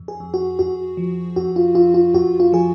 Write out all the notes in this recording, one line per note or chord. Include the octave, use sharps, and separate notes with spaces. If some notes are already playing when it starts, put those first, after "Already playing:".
Already playing: F2
G#4
F2
F#4
F2 F#4
F3
F2 F#4
F4
F2 F4
F4
F2 F#4
F4
F3 G#4